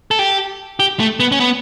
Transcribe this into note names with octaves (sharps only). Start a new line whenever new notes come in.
A4
G4
G4
A3
B3
C#4
B3